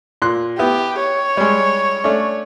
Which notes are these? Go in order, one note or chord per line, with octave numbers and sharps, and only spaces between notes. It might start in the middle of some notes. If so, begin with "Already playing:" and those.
A#2 C6 F#6
B3 E4 G4
C#5
G3 G#3
A3 C#4 D4